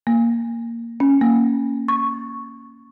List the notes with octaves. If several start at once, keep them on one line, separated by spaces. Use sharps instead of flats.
A#3
C#4
A#3
C#6